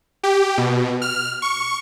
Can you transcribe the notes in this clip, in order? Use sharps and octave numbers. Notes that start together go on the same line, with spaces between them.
G4
B2
F6
C#6